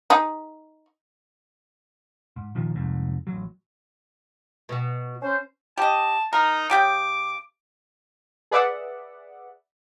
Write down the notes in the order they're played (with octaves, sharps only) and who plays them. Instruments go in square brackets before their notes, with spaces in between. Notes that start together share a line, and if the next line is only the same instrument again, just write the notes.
[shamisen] D#4 G#4
[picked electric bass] G#2
A#2 D#3 F3
F1 C2 F2 G#2
A1 F#3
[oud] B2 F#4
[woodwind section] C#4 C5
[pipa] G4 D#5 [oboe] A5
[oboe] D#4 [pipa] A#4
[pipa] C#3 G4 G5 [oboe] D6
[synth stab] G#4 B4 D5 E5 F#5